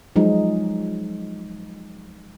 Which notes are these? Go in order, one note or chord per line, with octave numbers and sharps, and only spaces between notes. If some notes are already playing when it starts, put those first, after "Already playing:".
F3 F#3 G#3 D#4